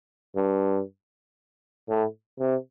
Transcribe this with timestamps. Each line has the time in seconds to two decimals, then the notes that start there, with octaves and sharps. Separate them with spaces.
0.36 G2
1.89 A2
2.40 C3